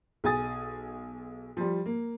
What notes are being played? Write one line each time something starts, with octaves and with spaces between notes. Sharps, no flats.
B1 G#4 G#5 D#6 A6
F3 G3
A#3